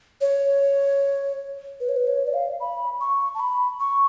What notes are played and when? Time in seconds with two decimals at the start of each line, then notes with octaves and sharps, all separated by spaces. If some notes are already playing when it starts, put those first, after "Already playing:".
0.21 C#5
1.80 B4
1.89 C#5
1.97 B4
2.07 C#5
2.26 D5
2.34 F5
2.60 B5
3.01 C#6
3.35 A5
3.40 B5
3.80 C#6